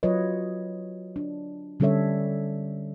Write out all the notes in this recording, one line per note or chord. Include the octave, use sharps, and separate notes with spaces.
F#3 F4 B4 C#5 D#5
D4
D3 G3 C#4 A4 C#5 E5